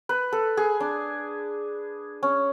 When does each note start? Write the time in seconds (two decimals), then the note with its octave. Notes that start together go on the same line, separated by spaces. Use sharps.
0.09 B4
0.33 A4
0.57 G#4
0.80 D4
2.23 C#4